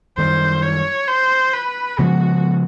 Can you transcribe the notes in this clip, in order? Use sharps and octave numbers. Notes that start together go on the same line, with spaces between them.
F#2 D#3 G3 C5
C#5
C5
B4
C#3 F3 G#3 B3 F#4